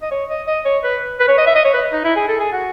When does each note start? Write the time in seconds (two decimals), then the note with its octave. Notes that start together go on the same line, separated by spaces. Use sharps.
0.02 D#5
0.11 C#5
0.29 D#5
0.47 D#5
0.65 C#5
0.84 B4
1.20 B4
1.28 C#5
1.38 D#5
1.46 E5
1.55 D#5
1.65 C#5
1.73 B4
1.92 D#4
2.04 E4
2.16 G#4
2.28 A4
2.40 G#4
2.53 F#4